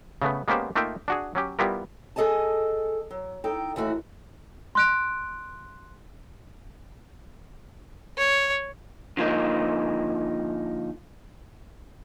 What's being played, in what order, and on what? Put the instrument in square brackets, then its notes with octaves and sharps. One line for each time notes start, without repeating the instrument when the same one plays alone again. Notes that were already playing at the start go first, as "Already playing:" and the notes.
[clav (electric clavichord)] C#3 A3 B3
G#3 A#3 B3 C#4 G4 C5
A3 A#3 D#4 F4 E5 G5
D4 F#4 G#4
F#3 C#4 G4
G3 B3 E4 F4 G4 A#4
[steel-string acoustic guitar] G#4 A4 D#5 G#5 A5
F#3
D#4 A4 G5
D#2 E3 A3 F#4
[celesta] C6 F#6 D7
[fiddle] C#5
[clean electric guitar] D3 F3 A#3 D#4